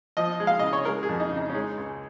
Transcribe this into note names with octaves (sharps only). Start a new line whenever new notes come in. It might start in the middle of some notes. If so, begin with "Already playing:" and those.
F3 D#5
G#3
F5
C#3 D#5
C#5
G#3 A#4
G#4
F2
D#4
C#3
D#4
C#4
G#3 D#4
C#2